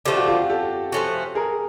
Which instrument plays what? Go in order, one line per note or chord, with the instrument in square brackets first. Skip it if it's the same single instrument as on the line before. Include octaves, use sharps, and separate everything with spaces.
[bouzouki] D3 F3 A3 [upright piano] G4
[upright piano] F#4
F4 G4
G4 A4
[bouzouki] F3 A3 C#4 F#4
[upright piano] G#4 A#4